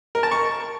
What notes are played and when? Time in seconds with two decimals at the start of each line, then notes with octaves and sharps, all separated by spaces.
0.15 A#4
0.23 A5
0.31 C#6